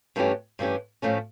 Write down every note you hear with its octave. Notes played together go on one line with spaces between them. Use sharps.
G2 E3 A3 C#4 G4
G2 E3 A3 C#4 G4
A2 F3 A3 C#4